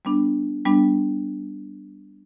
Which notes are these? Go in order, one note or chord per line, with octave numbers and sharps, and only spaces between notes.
G3 B3 D4
G3 B3 D4